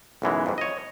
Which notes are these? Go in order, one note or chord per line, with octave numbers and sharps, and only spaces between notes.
B1 F#2 E3 G#3
F2 G#2
C#5 D#5